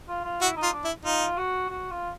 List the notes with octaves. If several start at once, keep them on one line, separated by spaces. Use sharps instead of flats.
F4
F4
E4 F#4
D#4
F4
D4
E4
D#4 F4
F#4
F#4
F4